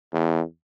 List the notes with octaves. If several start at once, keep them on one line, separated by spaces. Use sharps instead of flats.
E2